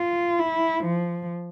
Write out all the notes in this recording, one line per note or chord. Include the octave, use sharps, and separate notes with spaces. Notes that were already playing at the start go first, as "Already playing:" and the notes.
Already playing: F4
E4
F3